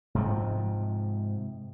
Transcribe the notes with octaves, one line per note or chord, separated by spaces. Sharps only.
G#2 C3 F3